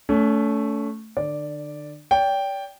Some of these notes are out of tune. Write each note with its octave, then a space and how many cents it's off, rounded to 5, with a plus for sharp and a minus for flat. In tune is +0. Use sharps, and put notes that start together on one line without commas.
A3 +0 C#4 +35
D3 +35 D5 +0
D5 -45 G5 +0